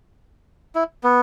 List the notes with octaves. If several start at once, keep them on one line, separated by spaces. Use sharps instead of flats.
E4
B3